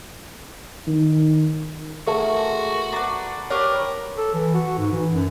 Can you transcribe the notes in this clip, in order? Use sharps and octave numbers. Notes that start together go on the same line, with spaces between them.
D#3
A3 F#4 G#4 A#4
D4 B4 F#5 A#5
D4 G4 A#4 B4 C#5
A4
E3
F#4
G#2
E3
F#2